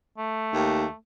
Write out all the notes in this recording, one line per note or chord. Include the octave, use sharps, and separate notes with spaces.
A3
D#2